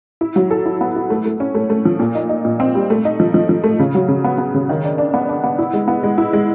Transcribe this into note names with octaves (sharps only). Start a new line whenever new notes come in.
E4
F#3
A4
E4
B3
E4
A3
A3
C#4
A3
A3
F3
A#2
D#4
D#4
A#2
C4
G3
A3
D#4
F3
F3
F3
A3
C#3
F#3
C#3
B3
B3
C#3
D#3
D4
D4
B3
D4
B3
E4
G#3
B3
G#3
E4
G#3